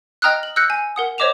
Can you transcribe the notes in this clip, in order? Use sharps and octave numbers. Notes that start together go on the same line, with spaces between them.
D#5 G5 A#5 D#6 F6 F#6
F#7
E6 F#6 G6 A#6 C#7
G#5
A#4 F#5 D#6
C5 C#5 D#5 D6 E7 F7